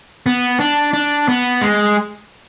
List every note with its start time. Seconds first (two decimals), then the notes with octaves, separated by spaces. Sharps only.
0.26 B3
0.60 D4
0.93 D4
1.28 B3
1.61 G#3